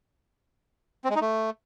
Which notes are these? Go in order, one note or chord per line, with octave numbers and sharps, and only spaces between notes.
C4
G#3
D#4
A3